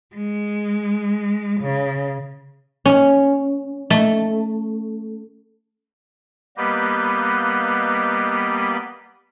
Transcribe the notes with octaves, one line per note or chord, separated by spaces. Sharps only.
G#3
C#3
C#4
A3
G3 A#3 B3 G4 B4 D#5